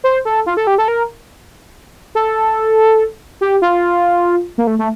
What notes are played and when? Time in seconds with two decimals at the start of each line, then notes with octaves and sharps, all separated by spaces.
0.04 C5
0.25 A4
0.46 F4
0.57 A4
0.67 G4
0.78 A4
0.88 A#4
2.15 A4
3.41 G4
3.62 F4
4.58 A#3
4.67 A3
4.79 A3